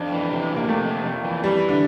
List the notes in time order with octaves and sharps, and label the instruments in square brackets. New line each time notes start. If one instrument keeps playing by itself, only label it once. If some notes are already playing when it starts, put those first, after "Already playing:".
Already playing: [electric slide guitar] F2 [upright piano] D4
[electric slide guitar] E3
C3
F2
[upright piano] A#3
[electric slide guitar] C3 [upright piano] A3
[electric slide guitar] F2
F2
E3
[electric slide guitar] E3 [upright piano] G3
[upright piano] D3